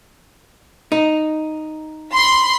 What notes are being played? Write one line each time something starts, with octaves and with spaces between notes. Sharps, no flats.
D#4
B5 C6